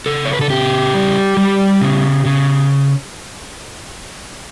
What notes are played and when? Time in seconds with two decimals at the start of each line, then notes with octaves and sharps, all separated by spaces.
0.06 C#3 A4
0.25 C#5
0.33 B4
0.41 A4
0.50 C#3 G4
0.94 G3
1.37 G3
1.82 C#3
2.25 C#3